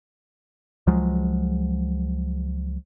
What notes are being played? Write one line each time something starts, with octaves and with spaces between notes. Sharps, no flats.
C#2 F3 F#3 G#3